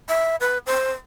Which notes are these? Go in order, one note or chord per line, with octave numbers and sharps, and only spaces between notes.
E5
B4
C5